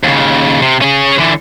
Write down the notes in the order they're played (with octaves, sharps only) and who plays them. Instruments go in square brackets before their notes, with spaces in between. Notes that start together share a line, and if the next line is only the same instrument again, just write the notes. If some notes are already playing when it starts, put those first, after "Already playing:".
[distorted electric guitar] D#2 C#3
C3
C#4 G#4
D3 E3